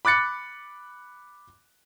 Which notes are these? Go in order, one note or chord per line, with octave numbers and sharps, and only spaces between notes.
B5 D6 F#6 A6 C#7